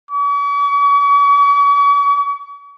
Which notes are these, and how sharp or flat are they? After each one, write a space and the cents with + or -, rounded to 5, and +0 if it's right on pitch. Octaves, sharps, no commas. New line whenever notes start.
C#6 +45